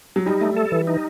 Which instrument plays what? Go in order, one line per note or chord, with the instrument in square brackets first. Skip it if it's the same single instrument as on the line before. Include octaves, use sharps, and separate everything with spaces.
[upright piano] F#3
[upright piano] G3 [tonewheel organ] D#4
[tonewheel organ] A3
A4
E3
D#4